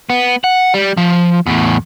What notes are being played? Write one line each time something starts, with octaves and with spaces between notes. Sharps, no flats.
B3
F#5
G3
F3
E2 A2